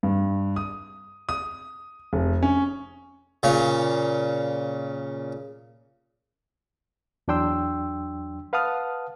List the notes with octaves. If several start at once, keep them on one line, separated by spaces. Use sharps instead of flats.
G2
D#6
D#6
F1
C#4
A#2 C#3 C#5
E2 F#3 D4 G5 C6 E6
B4 F5 F#5 A5 D#6 F6